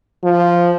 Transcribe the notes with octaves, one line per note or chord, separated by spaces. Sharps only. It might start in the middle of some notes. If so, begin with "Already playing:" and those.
F3